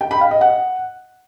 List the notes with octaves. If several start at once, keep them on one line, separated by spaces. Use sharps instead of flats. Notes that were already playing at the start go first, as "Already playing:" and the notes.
G5
B5
F5
D#5
F#5